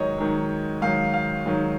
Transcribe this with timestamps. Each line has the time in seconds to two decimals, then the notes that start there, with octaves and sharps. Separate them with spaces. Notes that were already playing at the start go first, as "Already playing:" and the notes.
Already playing: G#2 D#3 F#3 C#5 D#5
0.18 G#2 D#3 F#3
0.82 G#2 D#3 F#3 F5
1.14 F5
1.46 G#2 D#3 F#3